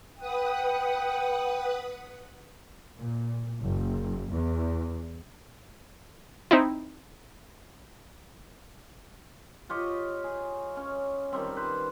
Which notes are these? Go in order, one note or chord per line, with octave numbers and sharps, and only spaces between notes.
B4 F#5 G5 D#6
A#2
F#1
E2
C4 D#4 E4
F4 G4 C#5 D#5
G#4
C#4
D#3 G3 C4
B4 C5